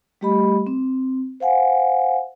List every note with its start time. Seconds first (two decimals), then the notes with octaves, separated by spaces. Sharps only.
0.21 G3 A3 G4 D#5 B5
0.67 C4
1.40 C5 F5 F#5 G#5